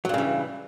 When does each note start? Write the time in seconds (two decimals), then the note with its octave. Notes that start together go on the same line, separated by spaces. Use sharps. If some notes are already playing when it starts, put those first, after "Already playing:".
0.05 F#3
0.09 G2
0.14 C#3
0.18 E3